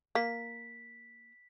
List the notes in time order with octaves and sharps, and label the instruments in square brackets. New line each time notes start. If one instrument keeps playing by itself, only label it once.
[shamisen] A#3 [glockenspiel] B6